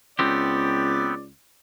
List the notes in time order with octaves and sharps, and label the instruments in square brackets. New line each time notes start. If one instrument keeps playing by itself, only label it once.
[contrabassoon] C#2 [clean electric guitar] B3 C4 G4 [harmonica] D5